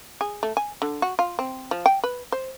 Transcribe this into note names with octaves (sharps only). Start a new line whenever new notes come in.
G#4
A3
G#5
D3
F#4
F4
C4
F3
G5
B4
C5